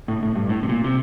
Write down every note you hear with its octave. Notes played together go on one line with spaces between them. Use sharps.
A2
A2
G2
A2
C3
A#2
C3